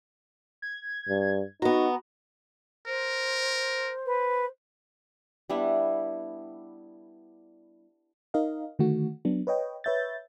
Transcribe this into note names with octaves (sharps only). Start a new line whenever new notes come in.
G#6
G2
B3 D#4 F#4 A#5
A#4 C5
B4
G3 B3 D4 E4
D#4 A#4 D#5 F5
D3 D#3 A3 F#4
F#3 B3 D4
B4 C#5 D#5 G5
B4 C#5 E5 G6 A6